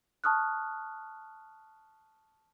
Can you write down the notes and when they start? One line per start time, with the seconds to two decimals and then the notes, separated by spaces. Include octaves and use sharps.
0.24 A5 C#6 D#6 F6 F#6